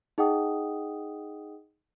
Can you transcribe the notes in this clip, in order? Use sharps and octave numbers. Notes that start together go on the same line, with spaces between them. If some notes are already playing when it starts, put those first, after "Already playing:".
D#4 G#4 D#5 F#5 G5 D#6